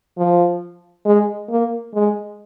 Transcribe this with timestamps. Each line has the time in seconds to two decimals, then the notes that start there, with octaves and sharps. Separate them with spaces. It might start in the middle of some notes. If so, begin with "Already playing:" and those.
0.17 F3
1.06 G#3
1.50 A#3
1.94 G#3